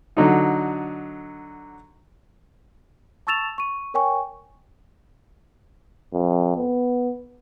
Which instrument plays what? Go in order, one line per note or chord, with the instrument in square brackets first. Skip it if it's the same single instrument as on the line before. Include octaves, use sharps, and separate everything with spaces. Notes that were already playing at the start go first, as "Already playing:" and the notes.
[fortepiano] D3 F#3 D#4
[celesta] A5 C#6 E6 A6 E7 F7
C#6 D#7
A#4 C#5 G5 G#5 C#6
[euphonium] F2
B3